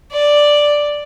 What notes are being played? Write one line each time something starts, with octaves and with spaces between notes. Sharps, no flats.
D5